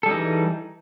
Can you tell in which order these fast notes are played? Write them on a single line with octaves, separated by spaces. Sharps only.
A4 G3 G#4 D#4 E3